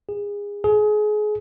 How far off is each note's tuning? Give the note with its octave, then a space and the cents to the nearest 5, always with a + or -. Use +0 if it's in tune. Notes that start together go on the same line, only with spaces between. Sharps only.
G#4 -25
G#4 +30